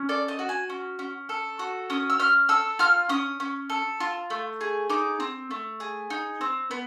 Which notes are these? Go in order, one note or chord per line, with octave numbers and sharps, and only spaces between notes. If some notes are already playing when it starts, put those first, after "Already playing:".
Already playing: C#4
A4 D5
D#5
F#4
G#5
C#4
C#4
A4
F#4
C#4 D#6
E6
C#4 F6
A4 E6
F4 F6
C#4 D#6
C#4
A4
F4
A3
G#4
D#4 D6
C4
A3
G#4
D#4
C4
B3